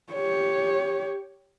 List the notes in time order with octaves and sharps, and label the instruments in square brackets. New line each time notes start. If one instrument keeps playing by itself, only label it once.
[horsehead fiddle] G4 C#5